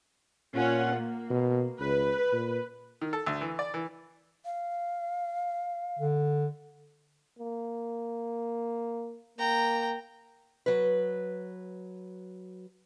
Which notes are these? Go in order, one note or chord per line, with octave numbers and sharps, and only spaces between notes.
A#2 C#4 F4 F#5
A#3
B2
C#2 B4
A#2
D#3
A4
D2
E3
D5
E3
F5
D3
A#3
A#3 G5 A#5
F#3 B4